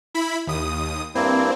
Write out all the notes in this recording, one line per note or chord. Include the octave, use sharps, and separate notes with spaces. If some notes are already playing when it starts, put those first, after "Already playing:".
E4 B5
D#2 D#6
G2 A#3 C4 E4